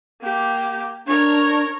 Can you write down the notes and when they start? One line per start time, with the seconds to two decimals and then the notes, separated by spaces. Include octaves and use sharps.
0.22 A#3 G4
1.07 D4 A#4 C#5